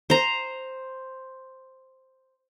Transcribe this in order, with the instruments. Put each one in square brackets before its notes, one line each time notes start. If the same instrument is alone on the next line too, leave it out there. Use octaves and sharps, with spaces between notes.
[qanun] C5 A#5